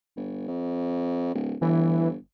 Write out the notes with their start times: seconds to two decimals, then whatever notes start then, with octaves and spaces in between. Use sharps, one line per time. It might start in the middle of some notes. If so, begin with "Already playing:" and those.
0.17 G1
0.48 F2
1.35 D1
1.61 G1 E3